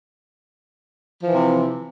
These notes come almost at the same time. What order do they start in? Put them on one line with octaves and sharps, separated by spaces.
F3 E3 C3